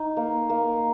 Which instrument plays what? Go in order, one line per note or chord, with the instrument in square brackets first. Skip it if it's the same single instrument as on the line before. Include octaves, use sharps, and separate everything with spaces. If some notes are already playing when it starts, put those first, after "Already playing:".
Already playing: [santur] D#4
A#3
A#3